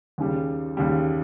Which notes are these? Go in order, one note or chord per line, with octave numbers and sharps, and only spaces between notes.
D#2 C#3 G3
D#2 C#3 G3